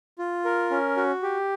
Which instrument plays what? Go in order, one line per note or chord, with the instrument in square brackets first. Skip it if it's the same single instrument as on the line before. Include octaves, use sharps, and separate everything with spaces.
[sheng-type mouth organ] F4
A#4
C#4
F#4
G4